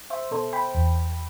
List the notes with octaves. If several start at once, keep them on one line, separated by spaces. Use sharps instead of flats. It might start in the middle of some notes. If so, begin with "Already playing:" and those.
C5 E5
B2 A4 C5
G5 B5
E2